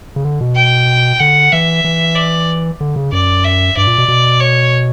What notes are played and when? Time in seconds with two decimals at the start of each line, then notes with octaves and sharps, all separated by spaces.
0.16 C#3
0.25 D3
0.41 B2
0.56 G5
1.20 D3 F#5
1.52 E3 E5
1.84 E3
2.16 D5
2.81 D3
2.96 C#3
3.12 F#2 D5
3.44 E5
3.77 G2 D5
3.87 A#2
3.98 B2
4.08 B2
4.40 C#5